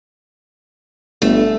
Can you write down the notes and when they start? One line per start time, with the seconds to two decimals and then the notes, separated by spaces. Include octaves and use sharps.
1.22 G1 A3